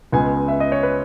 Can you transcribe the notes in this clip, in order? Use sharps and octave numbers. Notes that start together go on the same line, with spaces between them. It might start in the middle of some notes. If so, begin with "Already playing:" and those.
C#2 C#3 G#3 B3 G#5
E5
D#5
C#5
B4